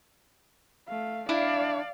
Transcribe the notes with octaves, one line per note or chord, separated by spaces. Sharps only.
A3 F5
D4 E4 D5 F5